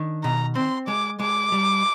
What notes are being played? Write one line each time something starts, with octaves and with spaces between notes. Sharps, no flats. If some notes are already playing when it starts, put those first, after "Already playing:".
Already playing: D#3 D4
B2 A#5
C4 C6
G#3 D6
G#3 D6
G3